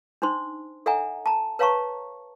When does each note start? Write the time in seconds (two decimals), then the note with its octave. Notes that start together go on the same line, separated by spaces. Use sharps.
0.22 D4 D#4 C5 C6
0.86 A4 D5 E5 F#5 G#5 A#5
1.26 A5 A#5
1.59 B4 C#5 F5 A5 A#5 C#6